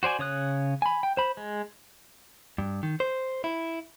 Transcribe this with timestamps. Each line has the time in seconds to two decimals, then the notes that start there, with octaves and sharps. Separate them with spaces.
0.03 F#4 C5 D5 G#5
0.19 C#3 C#5 D#6 F#6
0.82 G#5 B5
1.03 G5
1.17 C5 B5
1.37 G#3
2.58 G2
2.83 D#3
3.00 C5
3.44 E4